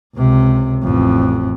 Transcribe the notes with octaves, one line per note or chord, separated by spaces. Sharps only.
C#2 C3
A1 F2